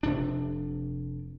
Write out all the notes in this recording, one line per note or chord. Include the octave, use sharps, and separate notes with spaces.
F1 C3 D4